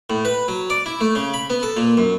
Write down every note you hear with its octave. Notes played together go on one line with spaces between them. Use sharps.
A2
B4
F#3
D5
E4
A3
C#3
B5
B3
A4
A#2
F#2